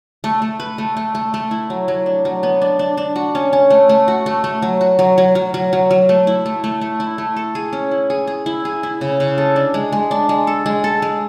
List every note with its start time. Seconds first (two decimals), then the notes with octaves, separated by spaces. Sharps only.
0.24 A3
0.42 A3
0.60 B4
0.78 A3
0.97 A3
1.15 A3
1.34 A3
1.51 E4
1.70 F#3
1.88 F#3
2.06 D4
2.25 F#3
2.43 B3
2.62 D4
2.79 D4
2.97 D4
3.16 F#4
3.35 C#4
3.53 C#4
3.70 A3
3.89 A3
4.08 F#4
4.26 A3
4.44 A3
4.62 F#3
4.81 F#4
4.99 F#3
5.18 F#3
5.35 F#3
5.54 F#3
5.73 F#3
5.91 F#3
6.09 A3
6.27 E4
6.46 A3
6.64 A3
6.81 A3
7.00 E4
7.18 A3
7.36 A4
7.55 G#4
7.73 C#4
7.91 E4
8.10 G#4
8.27 G#4
8.46 E4
8.65 G#4
8.83 E4
9.01 C#3
9.20 C#3
9.38 A4
9.56 D4
9.74 G#3
9.92 G#3
10.11 D4
10.29 G#3
10.47 A4
10.66 G#3
10.84 A4
11.02 G#3